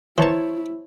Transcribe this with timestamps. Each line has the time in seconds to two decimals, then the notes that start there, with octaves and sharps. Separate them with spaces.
0.18 E3 E4 C5 C#5 A5 A#5